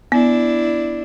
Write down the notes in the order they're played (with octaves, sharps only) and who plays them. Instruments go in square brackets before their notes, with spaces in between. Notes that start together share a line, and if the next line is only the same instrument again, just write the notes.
[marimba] B3 [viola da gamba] D4 E4